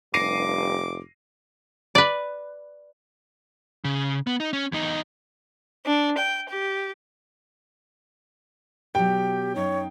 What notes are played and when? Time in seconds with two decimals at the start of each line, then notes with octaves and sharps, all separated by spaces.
0.14 F1 G2 D6 A#6 C7 D#7
1.95 B4 D5
3.85 C#3
4.27 B3
4.40 D#4
4.53 C#4
4.72 E2 D#4
5.86 D4
6.18 G5
6.50 G4
8.95 B2 F#3 G4 G5
9.56 F#2 D#4 C#5 F5